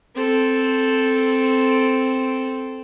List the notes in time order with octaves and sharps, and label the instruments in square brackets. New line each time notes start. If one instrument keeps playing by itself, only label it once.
[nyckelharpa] C4 A4